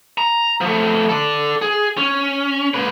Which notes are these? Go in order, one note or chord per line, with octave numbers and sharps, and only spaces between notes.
A#5
F3 A3
A4 D5
G#4
C#4
A#2 B4